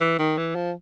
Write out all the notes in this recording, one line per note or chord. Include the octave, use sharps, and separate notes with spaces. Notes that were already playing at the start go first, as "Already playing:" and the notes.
E3
D#3
E3
F3